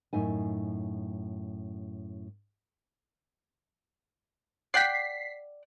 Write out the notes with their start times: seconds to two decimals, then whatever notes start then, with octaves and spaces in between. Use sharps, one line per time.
0.13 F#2 A2 D#4 G#5
4.74 D5 F#5 G5 B6 C7